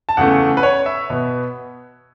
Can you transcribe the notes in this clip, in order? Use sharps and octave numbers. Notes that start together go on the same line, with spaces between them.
A5
E2 C#3 A3 F#5
B4
C#5
E5
B2 B3